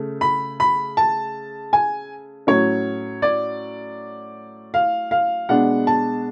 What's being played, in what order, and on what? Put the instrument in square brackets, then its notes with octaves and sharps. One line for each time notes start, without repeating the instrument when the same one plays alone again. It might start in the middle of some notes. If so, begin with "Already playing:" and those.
Already playing: [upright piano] C#3 A3
B5
B5
A5
G#5
A2 F#3 C#4 C#5
D5
F5
F5
B2 G#3 B3 D4 F#5
A5